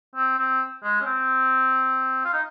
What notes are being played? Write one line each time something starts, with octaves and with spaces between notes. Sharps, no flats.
C4
C4
G#3
C#4
C4
F4
D#4